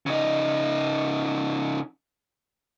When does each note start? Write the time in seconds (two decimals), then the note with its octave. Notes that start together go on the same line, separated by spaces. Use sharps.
0.06 C#3 D#4